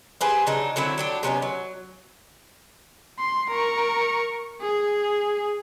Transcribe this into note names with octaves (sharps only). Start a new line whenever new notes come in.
G4 G#4 B4 C5
C#3 F#3 D4 D#4
D3 F#3 C4 E4
F#3 D4 G4
C3 B3 C#4 D#4
F#3
C6
A#4 C#6
G#4